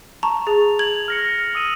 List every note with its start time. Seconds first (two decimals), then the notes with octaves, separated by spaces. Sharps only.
0.23 A5 A#5 C#6
0.47 G#4 A6 F7
0.79 G#6 F#7
1.08 F6 A#6 C#7
1.55 D#6 E6 D#7